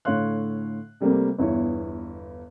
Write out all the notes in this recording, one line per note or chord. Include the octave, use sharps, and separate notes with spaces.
A2 D3 C#5 F5 C6 F#6
C3 G3 A3 A#3 C4
G1 E2 E4 C#5